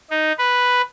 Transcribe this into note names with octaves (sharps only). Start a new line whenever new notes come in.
D#4
B4